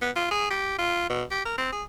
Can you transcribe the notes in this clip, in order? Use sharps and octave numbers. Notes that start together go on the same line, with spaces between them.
B3
F4
G#4
G4
F4
B2
G4
A#4
C4
G#4